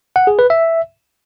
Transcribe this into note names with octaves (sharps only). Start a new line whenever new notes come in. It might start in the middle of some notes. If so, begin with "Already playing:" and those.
F#5
G#4
B4
E5